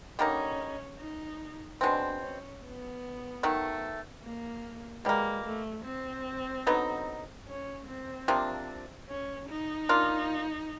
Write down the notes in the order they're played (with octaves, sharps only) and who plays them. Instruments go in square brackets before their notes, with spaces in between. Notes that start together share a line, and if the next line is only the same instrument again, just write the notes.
[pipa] D3 G3 A#3 D#4 [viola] C#4
[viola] D#4
[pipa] B2 G#3 C4 [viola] D4
[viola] C#4
B3
[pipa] D#3 F#3 A3
[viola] A#3
[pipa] B2 G3 A#3 [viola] G#3
[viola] A3
C4
[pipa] D3 F#3 B3 D#4
[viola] C#4
C4
[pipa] C3 F3 A#3 D4
[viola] C#4
D#4
[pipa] A#3 D4 F4